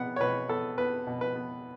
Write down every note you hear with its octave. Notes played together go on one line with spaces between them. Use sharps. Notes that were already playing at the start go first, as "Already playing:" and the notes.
Already playing: B2 B3 F#5
C#5
B2 B4
B3 A4
B3 B4
B2
B4
B3